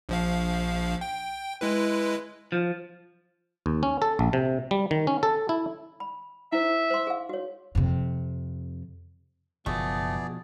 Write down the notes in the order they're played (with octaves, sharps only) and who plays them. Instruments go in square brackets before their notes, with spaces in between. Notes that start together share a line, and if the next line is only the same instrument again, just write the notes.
[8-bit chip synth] A#1 F3 F5
G5
G#3 E4 B4
[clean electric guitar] F3
[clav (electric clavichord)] D#2
C#4
A4
A#1
C3
G3
D#3
C#4
A4
E4
[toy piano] B5
[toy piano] E4 C5 [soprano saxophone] E5
[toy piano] C5 C6
G#4 F5
F#4 C#5
[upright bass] F2 C3
[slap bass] F#1 [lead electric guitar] B2 F3 [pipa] A3 [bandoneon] B3 G#4 D5